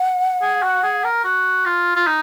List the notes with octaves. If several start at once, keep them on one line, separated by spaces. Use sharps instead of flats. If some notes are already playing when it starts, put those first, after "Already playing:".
Already playing: F#5
G#4
F#4
G#4
A#4
F#4
F4
F4
D#4